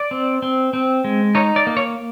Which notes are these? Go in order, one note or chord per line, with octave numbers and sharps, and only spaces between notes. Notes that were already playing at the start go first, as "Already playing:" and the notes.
Already playing: D5
C4
C4
C4
G#3
D#4 C#5
D5
A#3
C#5